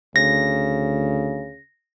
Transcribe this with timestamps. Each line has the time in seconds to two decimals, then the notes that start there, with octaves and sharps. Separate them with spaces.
0.16 D2 C#3 A#6